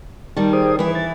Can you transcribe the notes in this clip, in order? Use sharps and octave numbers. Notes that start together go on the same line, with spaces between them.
D#3 G3 A5
G#4 C5 D#6
E3 E4 B4
A6